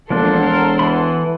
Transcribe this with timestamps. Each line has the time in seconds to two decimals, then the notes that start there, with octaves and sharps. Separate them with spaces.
0.10 E1 F3 A#3 D4 A4 F#5 C6
0.43 A#4
0.79 E3 B5